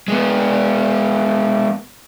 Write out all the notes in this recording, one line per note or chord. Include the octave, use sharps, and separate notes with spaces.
G#3 B3